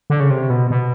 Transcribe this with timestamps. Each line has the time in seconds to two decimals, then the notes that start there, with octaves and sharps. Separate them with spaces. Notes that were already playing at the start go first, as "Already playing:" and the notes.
0.10 D3
0.20 C#3
0.30 C3
0.50 B2
0.71 B2